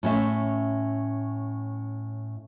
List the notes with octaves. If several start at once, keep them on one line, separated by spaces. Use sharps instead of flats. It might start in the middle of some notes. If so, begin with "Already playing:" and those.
A2 C#4 E5